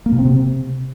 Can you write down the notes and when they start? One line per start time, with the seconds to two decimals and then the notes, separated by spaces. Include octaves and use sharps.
0.06 A#3
0.12 B2
0.19 C4
0.25 C3